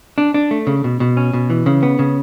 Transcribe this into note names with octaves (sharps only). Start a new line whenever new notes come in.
D4
D4
A3
C#3
B2
B2
C#4
B2
E3
C#3
B3
C#3